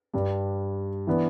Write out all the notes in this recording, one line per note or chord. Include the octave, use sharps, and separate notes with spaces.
G2 G3 D4
E3 B3 D4